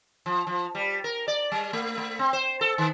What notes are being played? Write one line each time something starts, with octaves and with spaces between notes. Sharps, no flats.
F3
F3
G3
A#4
D5
G3
A3
A3
C4
C5
A4
D#3